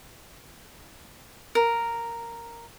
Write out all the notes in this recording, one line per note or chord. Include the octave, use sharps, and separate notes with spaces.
A#4